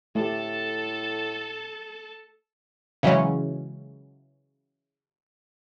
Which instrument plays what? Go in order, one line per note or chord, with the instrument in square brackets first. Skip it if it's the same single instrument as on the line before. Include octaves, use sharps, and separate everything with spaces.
[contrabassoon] A2 [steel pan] A3 G4 [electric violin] A4 A5
[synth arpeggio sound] C#3 E3 F#3 G#3 C#4